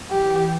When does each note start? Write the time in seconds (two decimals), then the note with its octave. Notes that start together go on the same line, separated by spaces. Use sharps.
0.11 E3 G4